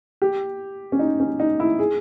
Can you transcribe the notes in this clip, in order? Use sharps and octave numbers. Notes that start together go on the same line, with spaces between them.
G4
C#4
D#4
C#4
D#4
E4
G#4